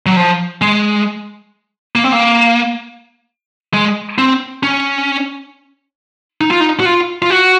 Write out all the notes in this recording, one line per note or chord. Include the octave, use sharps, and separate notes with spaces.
F#3
F3
G#3
A#3
C4
A#3
G#3
C4
C#4
D#4
F4
D#4
F#4
F4
F4
F#4